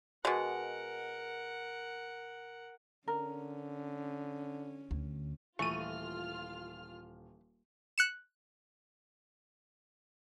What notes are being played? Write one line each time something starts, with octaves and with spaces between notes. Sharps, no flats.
B2 G#3 A#4 F#5
D3 C#4 A#4
D2
D#1 E3 A3 F4 C#6 F6 D#7
F#6 C#7 E7